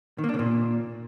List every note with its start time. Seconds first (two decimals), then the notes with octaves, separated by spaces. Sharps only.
0.18 D#3
0.24 A#3
0.29 D4
0.34 C#3
0.39 A#2